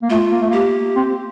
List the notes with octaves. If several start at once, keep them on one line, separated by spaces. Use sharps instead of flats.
A#3
A3 F4
A#3
A3
A#3 G4
C4